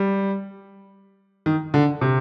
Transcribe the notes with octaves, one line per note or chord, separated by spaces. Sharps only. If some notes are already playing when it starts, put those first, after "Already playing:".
Already playing: G3
D#3
D3
C3